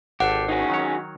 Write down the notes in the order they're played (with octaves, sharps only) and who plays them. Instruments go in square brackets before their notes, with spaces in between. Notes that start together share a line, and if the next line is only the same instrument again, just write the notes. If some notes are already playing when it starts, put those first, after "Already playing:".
[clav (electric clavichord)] G#1 [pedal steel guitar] G4 A4 [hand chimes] F#5
[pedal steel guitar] C#4 [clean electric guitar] D#4 F#4 G#4
[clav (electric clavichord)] D#3 F#3 C#5